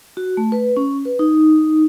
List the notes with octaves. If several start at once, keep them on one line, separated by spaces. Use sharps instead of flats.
F#4
A3
B4
C#4
B4
D#4